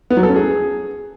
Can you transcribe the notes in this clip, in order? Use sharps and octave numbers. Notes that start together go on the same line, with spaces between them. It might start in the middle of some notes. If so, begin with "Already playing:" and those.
B3
F#3
A4
C#4
G#4